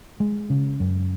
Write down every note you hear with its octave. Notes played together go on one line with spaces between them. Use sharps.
G#3
C#3
F#2